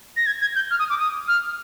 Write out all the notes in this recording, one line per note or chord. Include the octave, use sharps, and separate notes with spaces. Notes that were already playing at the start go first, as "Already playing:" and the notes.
A#6
G#6
G#6
G6
F6
D#6
D6
D#6
F6